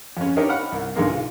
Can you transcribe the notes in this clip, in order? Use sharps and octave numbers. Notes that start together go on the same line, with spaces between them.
F2 C#4
D4 D#4 G4 A#4 C5 C#5
F#5 B5 F6
C2
B1 G#2 D3 G#3 A#3
F4